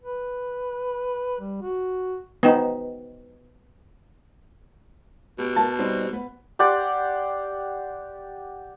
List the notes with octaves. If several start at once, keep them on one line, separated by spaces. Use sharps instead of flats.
B4
G3
F#4
B3 D#4 B4 C5 G5
B2 G4
A#4 A5
G3 C4 D#4
B3 B4
G4 D5 F#5 C6